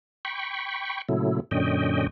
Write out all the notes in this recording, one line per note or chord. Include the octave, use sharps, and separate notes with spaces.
G5 B5 C#6
A#2 C#3 F#3 A3 E4
F#2 A#2 D3 C#4 D#5 G5